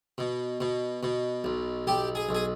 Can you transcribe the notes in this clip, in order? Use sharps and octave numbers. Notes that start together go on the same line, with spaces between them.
B2
B2
B2
B1
B1 G4
G#4
B1
G#4